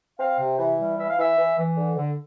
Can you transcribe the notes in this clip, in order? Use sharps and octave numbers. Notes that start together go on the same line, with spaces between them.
C4 F5
C3
E3
G3
E3 E5
F5
E3 E5
E3
E3
D3
D3